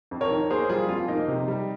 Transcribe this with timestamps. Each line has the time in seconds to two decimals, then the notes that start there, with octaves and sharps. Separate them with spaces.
0.11 F2
0.21 A#4 C#5
0.30 D#3
0.50 A#3 G#4 C5
0.69 G3 F4 G#4
0.89 F2 F4
1.08 A#3 D#4
1.28 C3
1.48 G3